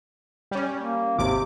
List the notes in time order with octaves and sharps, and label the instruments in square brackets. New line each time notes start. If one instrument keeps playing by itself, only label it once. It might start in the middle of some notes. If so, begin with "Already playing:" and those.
[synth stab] G3 C#4
[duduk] A#3
[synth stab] G#1 D#2 D6 [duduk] C3